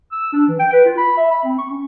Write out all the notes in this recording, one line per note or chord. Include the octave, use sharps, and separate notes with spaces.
E6
D4
E3
G5
B4
F4
B5
E5
B5
C4
C#6
C#4